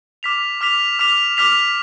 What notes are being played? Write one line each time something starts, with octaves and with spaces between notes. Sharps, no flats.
D6 F6 B6 F7
D6 F6 B6 F7
D6 F6 B6 F7
D6 F6 B6 F7